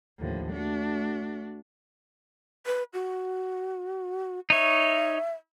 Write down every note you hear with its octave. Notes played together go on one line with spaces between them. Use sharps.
D#2 A2 D3 F3
A3 D4 F#4
B4
F#4
D#4 C#5 E5